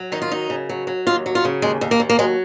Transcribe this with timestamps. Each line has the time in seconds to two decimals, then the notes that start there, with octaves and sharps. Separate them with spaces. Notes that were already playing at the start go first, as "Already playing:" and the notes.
Already playing: F#3
0.12 D#3 D#4
0.22 F4
0.31 F#3 D#4
0.50 C#3
0.69 F#3
0.87 F#3
1.07 D#2 F4
1.26 F#3
1.35 F4
1.45 C#3
1.62 D#2 G#3
1.81 D#2
1.91 A#3
2.00 D#2
2.09 A#3
2.19 F#3 G#3